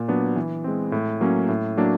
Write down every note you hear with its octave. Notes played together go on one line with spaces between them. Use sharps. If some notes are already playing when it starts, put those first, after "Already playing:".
Already playing: A#2
F#3 B3 D4
E3
G#3 C4
A2
F#3 A#3 C#4
A2
F#3 A#3 D4